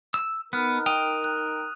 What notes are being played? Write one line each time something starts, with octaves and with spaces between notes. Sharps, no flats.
E6
B3 D#4 A#4 F6 F#6
G5 D#6 D#7 F7
F#6